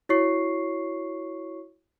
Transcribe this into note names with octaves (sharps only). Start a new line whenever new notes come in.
E4 F#4 C#5 C#6 C7